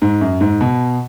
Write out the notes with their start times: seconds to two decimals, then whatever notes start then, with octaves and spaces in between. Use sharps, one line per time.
0.02 G#2
0.21 F#2
0.41 G#2
0.61 B2